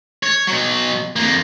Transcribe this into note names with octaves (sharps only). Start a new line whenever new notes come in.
C#5
B2 F#3
F2 A#3